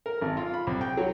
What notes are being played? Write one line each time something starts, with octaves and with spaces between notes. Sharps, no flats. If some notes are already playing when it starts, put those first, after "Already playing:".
A#4
G#1
F4
B5
C2
G5
F#3